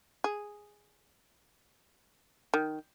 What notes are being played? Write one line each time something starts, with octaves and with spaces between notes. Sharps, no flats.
G#4
D#3